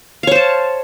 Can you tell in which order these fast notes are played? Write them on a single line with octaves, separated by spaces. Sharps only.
F5 C#5 C5 A5